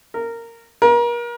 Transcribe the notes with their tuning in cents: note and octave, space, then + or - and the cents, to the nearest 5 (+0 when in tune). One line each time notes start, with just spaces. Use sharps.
A#4 -15
A#4 +35